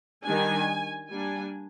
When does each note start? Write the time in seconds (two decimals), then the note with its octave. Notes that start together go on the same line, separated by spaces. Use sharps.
0.24 D#3 G3 D4 G#5
1.09 G3 A#3 D4 G#5